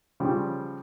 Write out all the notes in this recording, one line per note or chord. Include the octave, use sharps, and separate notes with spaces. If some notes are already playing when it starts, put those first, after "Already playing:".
C#3 F3 G3